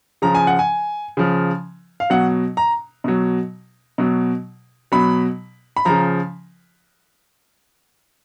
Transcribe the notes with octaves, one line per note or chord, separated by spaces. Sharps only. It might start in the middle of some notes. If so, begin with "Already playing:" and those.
C#3 F3 A#5
G#5
F#5
G#5
C#3 F3
F5
B2 F#3 F#5
A#5
B2 F#3
B2 F#3
B2 F#3 B5
B5
C#3 F3 A#5